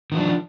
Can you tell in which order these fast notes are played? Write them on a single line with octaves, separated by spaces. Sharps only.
D#3 F3 D4